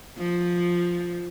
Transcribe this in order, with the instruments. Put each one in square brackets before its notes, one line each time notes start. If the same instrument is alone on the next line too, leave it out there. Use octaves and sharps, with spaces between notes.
[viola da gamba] F3